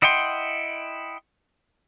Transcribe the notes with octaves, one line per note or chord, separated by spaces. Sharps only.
E4 D#5 F#5 G5 C6